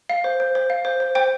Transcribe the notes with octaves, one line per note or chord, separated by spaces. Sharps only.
F5
C5
C5
C5
F5
C5
C5
C5 G5